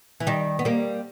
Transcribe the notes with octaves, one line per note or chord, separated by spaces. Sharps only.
E3
D#3 G3
B3
G3 A#3